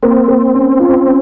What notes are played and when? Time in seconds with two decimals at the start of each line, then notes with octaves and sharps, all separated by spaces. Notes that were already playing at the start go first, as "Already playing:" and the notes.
0.03 A#3 C4
0.28 A#3
0.54 C#4
0.80 F4
1.06 C#4